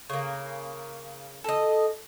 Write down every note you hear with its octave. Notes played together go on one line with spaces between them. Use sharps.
C#3 A#3
A4 D#5